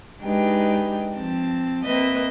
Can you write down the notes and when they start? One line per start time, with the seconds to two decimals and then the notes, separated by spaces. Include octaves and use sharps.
0.23 G#3 D4 D#4 G4 B4 G5
1.15 F3 C4 A5
1.84 A#3 C4 B4 D#5 E5